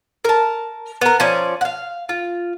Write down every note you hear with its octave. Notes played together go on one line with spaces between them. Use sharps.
A#4 A5
B3 A#4
F3 C#4 D5
F5 F#5
F4